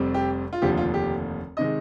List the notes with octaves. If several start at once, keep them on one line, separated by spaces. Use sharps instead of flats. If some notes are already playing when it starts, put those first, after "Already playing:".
Already playing: F1 F2 C3 G3 C4
G4
F4
F1 D#2 D3 F3 G4
F4
G4
C3 D#3 G#3 D#5